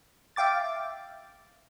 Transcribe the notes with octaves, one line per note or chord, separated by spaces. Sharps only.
E5 F5 G5 D6 A6